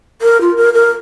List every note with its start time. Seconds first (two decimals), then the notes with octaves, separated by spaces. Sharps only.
0.22 A#4
0.41 F4
0.57 A#4
0.74 A#4